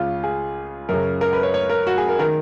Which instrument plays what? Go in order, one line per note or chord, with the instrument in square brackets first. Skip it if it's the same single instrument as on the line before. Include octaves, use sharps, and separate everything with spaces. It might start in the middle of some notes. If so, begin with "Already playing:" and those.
Already playing: [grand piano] C#2 C#3 F4
G#4
F#2 C#3 A#4
A#4
B4
C#5
C#5
A#4
F#4
G#4
A#4
D#3 A#4